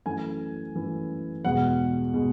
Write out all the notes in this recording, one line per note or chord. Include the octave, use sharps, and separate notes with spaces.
F#2 E3 A3 G#5
F#2 E3 A3
E2 B2 G#3 F#5
B2 G#3